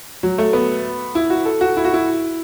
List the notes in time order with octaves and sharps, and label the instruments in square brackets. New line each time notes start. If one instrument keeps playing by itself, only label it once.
[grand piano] F#3
A3
B3
E4
F#4
A4
F#4
E4
F#4
E4